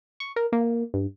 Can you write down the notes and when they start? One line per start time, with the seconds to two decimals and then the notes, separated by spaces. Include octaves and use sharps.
0.20 C#6
0.36 A#4
0.52 A#3
0.94 G2